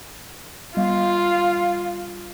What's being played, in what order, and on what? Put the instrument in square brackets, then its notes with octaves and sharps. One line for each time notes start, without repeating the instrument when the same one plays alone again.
[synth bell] G3 [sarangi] F4 [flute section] F5